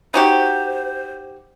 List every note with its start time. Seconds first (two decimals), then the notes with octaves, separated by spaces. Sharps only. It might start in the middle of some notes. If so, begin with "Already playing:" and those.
0.14 D#4 F#4 G4 C5